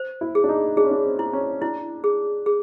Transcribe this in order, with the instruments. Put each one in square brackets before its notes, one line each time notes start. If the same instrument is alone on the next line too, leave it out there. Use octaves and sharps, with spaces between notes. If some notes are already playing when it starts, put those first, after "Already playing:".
Already playing: [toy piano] C5
[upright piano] E4
[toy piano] G#4
[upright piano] D4
D#4
[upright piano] D4 [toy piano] G#4
[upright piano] C#4
D4
C4
[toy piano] E4
[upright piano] C#4
[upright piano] D4 [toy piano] E4
[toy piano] G#4
G#4